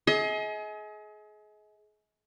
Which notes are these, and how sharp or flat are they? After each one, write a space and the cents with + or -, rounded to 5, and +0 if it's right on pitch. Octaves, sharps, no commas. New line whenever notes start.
G#4 +30 D#5 +40